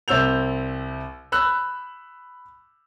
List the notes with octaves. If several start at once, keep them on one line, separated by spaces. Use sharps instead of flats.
C2 C4 E6 G6 F7
B5 E6 F#6